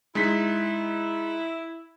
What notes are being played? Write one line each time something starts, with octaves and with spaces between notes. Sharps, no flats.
G#3 D#4 E4 B6